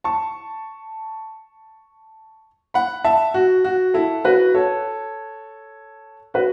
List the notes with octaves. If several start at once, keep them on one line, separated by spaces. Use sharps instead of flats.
A5 C#6
F#5 B5
E5 A5
F#4
F#4
E4 A4
F#4 B4
A4 C#5
F#4 B4